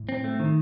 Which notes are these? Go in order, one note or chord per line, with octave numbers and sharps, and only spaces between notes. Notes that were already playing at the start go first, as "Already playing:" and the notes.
Already playing: A2
C4
A3
D#3